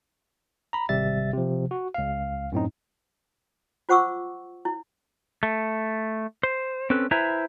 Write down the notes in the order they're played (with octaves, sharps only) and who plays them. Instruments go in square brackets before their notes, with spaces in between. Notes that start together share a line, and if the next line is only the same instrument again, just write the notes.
[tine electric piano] A#5 B5
G#1 C3 G3 E5 A6
C3 F3
F#4
C#2 F5
F#2 A2 C4 D#4
[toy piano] F4 C5 F#5 C#6 D6 E6
E4
[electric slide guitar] A3
C5
C4 C#4 A4 B4
E4 B4 C5 E5 G#5 A#5